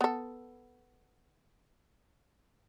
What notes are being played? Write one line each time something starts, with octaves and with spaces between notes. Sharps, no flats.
B3 A4